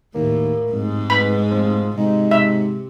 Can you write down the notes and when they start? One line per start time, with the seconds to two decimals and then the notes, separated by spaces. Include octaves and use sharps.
0.14 D#2 A2 A#3
0.72 F1 G#2 G#3
1.10 B3 B5
1.51 F1 F3
1.97 G#2 C3 D#4
2.31 E5